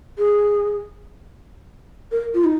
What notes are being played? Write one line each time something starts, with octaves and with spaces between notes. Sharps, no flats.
G#4
A#4
F4
D#4